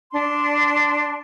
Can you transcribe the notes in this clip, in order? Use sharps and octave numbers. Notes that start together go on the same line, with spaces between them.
D4 C6